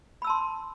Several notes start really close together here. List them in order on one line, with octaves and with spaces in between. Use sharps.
B5 E6 A5 C6